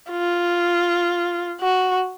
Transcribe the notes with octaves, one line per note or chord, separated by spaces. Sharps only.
F4
F#4